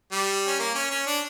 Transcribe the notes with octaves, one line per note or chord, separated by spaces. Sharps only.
G3
C#4
A#3
C#4
C#4
D4